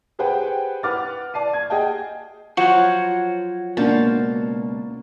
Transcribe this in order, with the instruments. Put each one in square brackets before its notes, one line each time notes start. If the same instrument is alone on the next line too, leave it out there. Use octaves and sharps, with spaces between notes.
[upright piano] G4 G#4 B4 C5 F#5 G5
B4 F#5 D6 F6 A6
D5 A5 C7 D#7
G#6
G#4 D#5 F#5 G5 A5
[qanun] F3 F#3 F4 [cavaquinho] F#4 [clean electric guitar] C5 C#5 F#5
[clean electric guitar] C#2 B2 [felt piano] A#3 D4 [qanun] F#4 C5 F5 [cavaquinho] A5